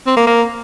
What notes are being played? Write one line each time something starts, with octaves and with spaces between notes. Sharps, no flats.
C4
A#3
A#3